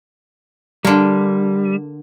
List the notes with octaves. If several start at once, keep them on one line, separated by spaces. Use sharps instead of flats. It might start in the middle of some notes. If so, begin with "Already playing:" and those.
D3 G3 A#3